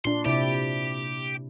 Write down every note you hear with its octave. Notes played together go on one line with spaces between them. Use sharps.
A#2 D4 C6
C3 E4 G4 D5